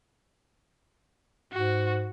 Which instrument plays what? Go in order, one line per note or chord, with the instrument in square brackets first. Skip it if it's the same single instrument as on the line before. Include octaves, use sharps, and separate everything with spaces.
[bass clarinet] G#2 [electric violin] F#4